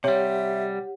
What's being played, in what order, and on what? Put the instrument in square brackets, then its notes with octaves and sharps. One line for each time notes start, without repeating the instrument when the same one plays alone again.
[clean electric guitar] C3 G3 [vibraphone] G4 F#5 [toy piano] C#5 [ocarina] E5